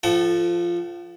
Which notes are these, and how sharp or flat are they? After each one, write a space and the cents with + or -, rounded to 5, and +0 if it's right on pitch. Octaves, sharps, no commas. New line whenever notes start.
F3 -10 A4 +0 F#5 +40